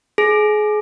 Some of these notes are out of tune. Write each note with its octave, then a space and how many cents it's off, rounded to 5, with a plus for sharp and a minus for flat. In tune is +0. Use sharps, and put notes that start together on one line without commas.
G#4 +30